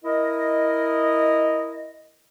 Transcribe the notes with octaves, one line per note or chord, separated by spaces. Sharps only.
E4 A#4 D#5